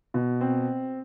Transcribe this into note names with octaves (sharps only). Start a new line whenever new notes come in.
B2
C4